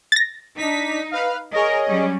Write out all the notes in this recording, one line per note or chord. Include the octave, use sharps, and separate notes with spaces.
A6 A#6
D4 D#4 B6
B4 F5
G#4 A#4 C#5 D#5
F#3 G3 C#4